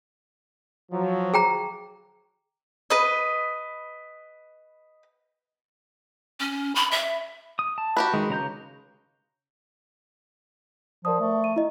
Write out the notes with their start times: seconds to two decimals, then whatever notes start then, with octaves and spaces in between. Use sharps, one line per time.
0.90 F3 F#3
1.34 G#4 G5 A#5
2.90 B4 D#5
6.40 C#4
6.76 B5
6.91 E5
7.59 D#6
7.78 A5
7.97 F#4 G4 B4
8.14 D#3 G#3
8.30 C#3 A#5 G6
11.05 F3 A#4 D5 D#6
11.21 A3
11.44 D#7
11.56 E4 D#5